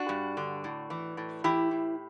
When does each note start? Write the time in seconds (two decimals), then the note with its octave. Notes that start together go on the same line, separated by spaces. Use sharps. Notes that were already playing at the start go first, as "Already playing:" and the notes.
Already playing: D4 F#4
0.09 G2
0.37 D3
0.64 A2
0.90 E3
1.17 A2
1.44 E3 E4 G4
1.71 A2